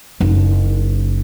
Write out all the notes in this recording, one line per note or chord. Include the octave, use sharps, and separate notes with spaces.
F#1 D#4